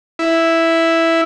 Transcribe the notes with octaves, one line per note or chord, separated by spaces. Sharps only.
E4